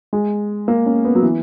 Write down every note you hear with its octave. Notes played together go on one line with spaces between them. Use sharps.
G#3
A#3
C#4
B3
F#3
E3